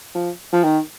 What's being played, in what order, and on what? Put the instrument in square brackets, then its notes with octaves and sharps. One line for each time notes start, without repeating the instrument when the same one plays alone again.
[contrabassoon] F3
F3
D#3